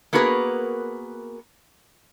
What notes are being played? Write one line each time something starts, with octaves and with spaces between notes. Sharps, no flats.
A#3 B3 F#4 G#4 A#4 B4